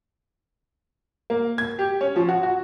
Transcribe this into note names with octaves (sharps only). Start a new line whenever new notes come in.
A#3
G#6
G4
C#4
F3
F#4
F#4